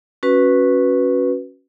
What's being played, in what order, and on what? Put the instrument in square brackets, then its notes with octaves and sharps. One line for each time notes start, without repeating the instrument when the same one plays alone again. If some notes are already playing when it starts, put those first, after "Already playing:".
[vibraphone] C#4 F#4 B4